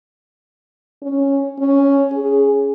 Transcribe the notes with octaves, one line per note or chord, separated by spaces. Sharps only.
C#4
C#4
G#4